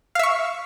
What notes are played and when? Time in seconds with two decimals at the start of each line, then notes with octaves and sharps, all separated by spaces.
0.15 F5
0.19 E5
0.23 C#6